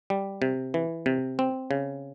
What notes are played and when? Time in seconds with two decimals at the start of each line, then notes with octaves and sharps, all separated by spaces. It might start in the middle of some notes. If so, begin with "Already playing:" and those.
0.10 G3
0.42 C3
0.74 E3
1.06 C3
1.39 C4
1.71 C#3